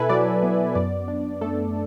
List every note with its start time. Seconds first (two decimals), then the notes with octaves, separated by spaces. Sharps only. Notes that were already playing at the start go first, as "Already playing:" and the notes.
Already playing: B2 E4 A4 B4 E5 G#5 B5
0.09 F#3 D5
0.43 B3
0.75 F#2 D5
1.08 D4
1.41 A3 A4